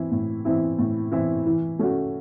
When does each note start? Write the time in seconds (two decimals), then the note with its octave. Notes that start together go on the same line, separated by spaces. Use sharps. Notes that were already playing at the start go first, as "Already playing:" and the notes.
Already playing: E3 C4 E4
0.11 A2
0.45 E3 C4 E4
0.79 A2
1.12 E3 C4 E4
1.46 E3
1.79 A3 C#4 F#4